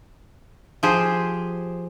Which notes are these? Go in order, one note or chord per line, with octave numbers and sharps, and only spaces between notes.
F3 G4 G#4 C5